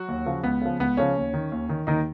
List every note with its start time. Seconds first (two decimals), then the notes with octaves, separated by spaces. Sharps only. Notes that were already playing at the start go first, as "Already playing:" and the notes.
Already playing: F#3 F#4
0.08 D#2
0.26 C#3 F3
0.43 C#2 B3
0.61 C#3 F3
0.80 C#2 B3
0.97 C#3 F3 C#4
1.16 D#2
1.34 D#3
1.52 D#2
1.69 D#3
1.87 D#2 D#3 D#4